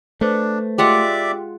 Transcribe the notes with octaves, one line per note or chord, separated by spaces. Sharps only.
A3 D4 B4 C5
G#3 F4 G4 D5 E5 F#5 G5 D6